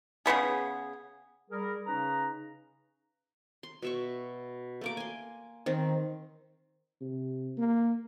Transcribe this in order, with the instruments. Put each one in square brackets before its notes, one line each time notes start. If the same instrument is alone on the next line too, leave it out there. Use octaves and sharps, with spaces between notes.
[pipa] C#3 G3 B3 G#4
[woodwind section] G3 G#4 A#4
C#3 C#4 D#4 B4 A#5
[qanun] C6
B2 E5 C#6
A3 A#3 D6
G#5 C6
D#3 C4
[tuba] C3
A#3